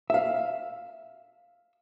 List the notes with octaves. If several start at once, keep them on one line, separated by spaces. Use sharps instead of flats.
E5 F5